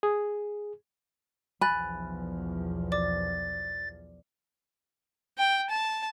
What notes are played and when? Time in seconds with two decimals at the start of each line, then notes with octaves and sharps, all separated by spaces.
0.03 G#4
1.61 B1 E2 F3 G#5 B5 F#6 A6
2.92 D5 D6 A6
5.38 G5
5.70 A5